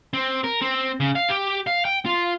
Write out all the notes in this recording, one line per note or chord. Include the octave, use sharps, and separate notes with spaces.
C4
A#4
C4
C#3
F5
G4
F5
G5
F4